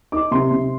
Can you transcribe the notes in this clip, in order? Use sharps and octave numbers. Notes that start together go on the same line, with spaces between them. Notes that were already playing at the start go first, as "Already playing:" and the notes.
D#4 D6
C3 C6
C3